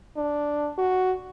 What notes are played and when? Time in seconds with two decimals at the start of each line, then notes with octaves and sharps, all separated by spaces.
0.17 D4
0.78 F#4